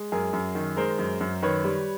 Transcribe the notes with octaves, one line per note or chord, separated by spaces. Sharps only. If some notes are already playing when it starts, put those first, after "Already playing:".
Already playing: G#3
F#2 G#4 A#4
F#2
D#3
G#3 A#4 C5
F#2
F#2
D#3 B4 C#5
G3